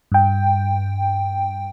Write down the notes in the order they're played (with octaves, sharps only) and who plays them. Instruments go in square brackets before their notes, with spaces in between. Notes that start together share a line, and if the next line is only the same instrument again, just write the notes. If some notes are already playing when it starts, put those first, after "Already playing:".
[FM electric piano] G2 G5